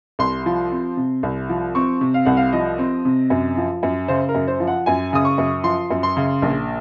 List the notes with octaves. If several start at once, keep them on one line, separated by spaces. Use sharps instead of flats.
C2 C6
F3
C4
C3
C2
F3
C4 C#6
C3
F5
C2 F#5
F5
F3 D#5
C4
C3
F#2
F3
F#2
C#3 C5
A#4
F#2
C5
F3
F#5
F#2 G#5
C#3 D#6
C#6
F#2
F3 C6
F#2
C6
C#3
A#1